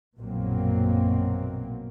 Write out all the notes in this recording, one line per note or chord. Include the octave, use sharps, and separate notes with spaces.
A#1 F#2 B2 F#3 A#3 C4